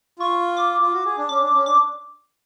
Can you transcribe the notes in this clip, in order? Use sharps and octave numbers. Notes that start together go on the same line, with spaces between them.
F4 C#6
D6
F4
F#4
G#4
D4
C#4 D6
D4
C#4
D4 D6